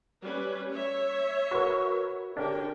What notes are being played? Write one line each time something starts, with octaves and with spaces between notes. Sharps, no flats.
G3 C#4 B4
C#5 E5
F#4 A#4 B4 C#6
D3 C#4 D4 G4 A#4 D5 G5